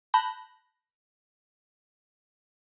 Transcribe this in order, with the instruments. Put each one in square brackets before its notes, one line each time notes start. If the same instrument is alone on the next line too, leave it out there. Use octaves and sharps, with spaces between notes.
[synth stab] A5 B5 F#6 G6 A#6